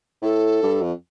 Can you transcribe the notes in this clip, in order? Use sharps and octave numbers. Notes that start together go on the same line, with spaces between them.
A2 A4
G2
F2